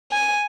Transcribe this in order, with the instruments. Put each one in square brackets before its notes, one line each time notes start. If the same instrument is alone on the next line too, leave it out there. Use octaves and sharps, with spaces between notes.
[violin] G#5